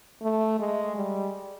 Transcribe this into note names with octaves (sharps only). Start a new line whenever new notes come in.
A3
G#3
G3